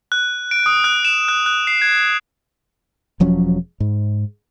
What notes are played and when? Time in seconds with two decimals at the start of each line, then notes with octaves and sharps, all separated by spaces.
0.12 F#6
0.51 D7
0.66 D#6
0.84 F#6
1.05 E7
1.28 F#6
1.46 F#6
1.67 C7
1.82 G#6
3.20 E1 F3 F#3 C#4
3.80 G#2